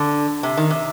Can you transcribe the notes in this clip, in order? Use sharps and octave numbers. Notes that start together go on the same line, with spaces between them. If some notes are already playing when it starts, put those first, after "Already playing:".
Already playing: D3
C3
D#3
C3